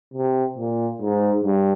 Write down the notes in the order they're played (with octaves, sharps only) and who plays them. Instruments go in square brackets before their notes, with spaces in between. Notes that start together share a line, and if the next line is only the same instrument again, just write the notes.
[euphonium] C3
A#2
G#2
G2